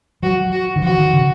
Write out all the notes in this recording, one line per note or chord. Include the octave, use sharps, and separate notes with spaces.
F#3 F#4
F#4
D#3
F3 F#4
D#3
C#3